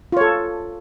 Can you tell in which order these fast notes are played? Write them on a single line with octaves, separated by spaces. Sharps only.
F4 C#5 A4